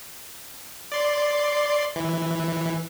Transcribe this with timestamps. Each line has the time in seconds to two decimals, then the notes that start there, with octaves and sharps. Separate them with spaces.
0.92 D5 C6
1.96 E3